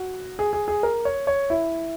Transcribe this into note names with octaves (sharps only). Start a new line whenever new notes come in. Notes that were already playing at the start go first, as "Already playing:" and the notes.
Already playing: F#4
G#4
G#4
G#4
A#4
C#5
C#5
E4